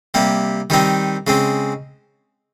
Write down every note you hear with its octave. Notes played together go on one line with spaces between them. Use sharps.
C3 G3 A#3
D#3 G3 C4 D#4
C#3 G#3 C4